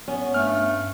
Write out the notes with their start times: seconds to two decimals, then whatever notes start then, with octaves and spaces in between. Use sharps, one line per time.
0.08 B3 C#4
0.34 G2 A3 F6